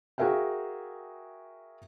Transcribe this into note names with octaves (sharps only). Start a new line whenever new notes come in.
F#4 G#4 A#4 E5 F5 G5